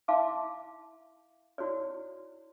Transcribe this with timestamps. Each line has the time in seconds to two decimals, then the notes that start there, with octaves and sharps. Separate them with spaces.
0.08 E4 E5 F5 A5 C6 D6
1.58 E4 F#4 C#5 D5